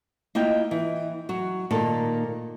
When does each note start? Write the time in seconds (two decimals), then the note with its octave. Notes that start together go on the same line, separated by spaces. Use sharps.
0.35 A#3 E4 F4 D#5 G5
0.71 E3
1.29 F#3 F#4
1.71 A#2 D#3 A#3 A4